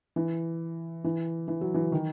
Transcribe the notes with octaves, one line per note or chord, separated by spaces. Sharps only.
E3
E3
E3
F#3
E3
D#3